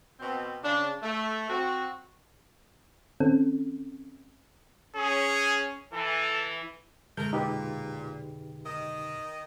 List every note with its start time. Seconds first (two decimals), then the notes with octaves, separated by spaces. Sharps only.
0.20 B2 C4
0.63 C#3 D4
1.02 A3
1.49 C4 F#4
3.20 D#3 C4 C#4 A4
4.96 C#4 G#4
5.93 E3 A4
7.17 F2 B2 D3 G#3 A3 A#4 G6
7.33 A#2 D#4 G4 B4
8.64 D#3 D#5